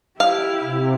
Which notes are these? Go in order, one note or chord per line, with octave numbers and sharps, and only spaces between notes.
E4 G4 F5
C3